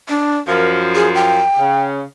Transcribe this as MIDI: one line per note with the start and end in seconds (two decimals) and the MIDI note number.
0.09 0.36 62
0.47 1.40 42
0.47 1.40 53
0.47 0.79 70
0.95 1.09 68
1.15 1.82 79
1.58 2.01 49